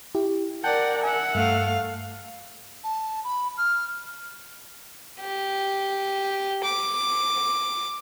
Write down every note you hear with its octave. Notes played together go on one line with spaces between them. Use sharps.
E4 G4
A#4 D5 F#5 G5 A5 G6
E5 F#5 G#5
G2 A3 F5
A5
B5
F6
G4
D6